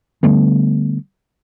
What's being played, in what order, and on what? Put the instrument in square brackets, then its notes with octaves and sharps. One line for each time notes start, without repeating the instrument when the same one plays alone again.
[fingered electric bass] D3 G3 A3 B3